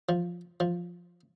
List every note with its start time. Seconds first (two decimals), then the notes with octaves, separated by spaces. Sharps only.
0.09 F3
0.60 F3